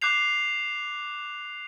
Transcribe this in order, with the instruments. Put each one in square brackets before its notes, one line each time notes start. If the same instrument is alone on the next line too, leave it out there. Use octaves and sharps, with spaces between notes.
[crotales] D6 F#6 G6 C7 F7